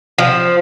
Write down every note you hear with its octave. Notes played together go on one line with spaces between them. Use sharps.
F3